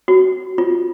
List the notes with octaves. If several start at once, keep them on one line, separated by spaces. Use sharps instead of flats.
F#4
F4